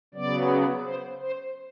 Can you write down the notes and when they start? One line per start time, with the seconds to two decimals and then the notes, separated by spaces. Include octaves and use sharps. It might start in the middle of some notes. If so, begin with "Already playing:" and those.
0.14 C#3 F#3 B3 D5
0.84 C5
1.21 C5